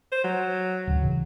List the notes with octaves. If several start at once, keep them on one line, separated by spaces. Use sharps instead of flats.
C5
F#3
D1 C#2
A2 C#3 E3